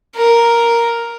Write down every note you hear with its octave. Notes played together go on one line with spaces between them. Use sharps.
A#4